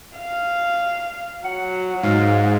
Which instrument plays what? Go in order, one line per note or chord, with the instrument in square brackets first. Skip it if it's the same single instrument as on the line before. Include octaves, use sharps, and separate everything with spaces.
[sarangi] F5
[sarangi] F#3 [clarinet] F#5
[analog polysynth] G#2 [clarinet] F5